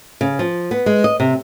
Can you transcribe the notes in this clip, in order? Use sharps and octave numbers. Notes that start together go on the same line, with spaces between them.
C#3
F3
B3
G#3
D#5
C3